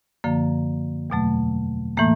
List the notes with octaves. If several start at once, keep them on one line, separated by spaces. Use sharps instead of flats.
F#2 D3 F3 A#3
E2 B2 F#3 A3
A2 E3 A3 A#3